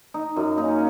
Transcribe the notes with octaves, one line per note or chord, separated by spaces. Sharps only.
D#4
F#2
A#3 C#4 D#4